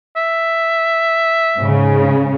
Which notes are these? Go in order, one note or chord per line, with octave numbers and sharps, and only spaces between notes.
E5
G#2 C#3